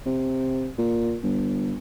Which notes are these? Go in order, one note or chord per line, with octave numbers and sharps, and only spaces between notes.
C3
A#2
G1